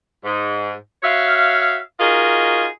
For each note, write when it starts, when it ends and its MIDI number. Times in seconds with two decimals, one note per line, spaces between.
0.24 0.73 44
1.03 1.78 66
1.03 1.78 73
1.03 1.78 76
1.03 1.78 77
1.99 2.66 63
1.99 2.66 65
1.99 2.66 66
1.99 2.66 68
1.99 2.66 70
1.99 2.66 75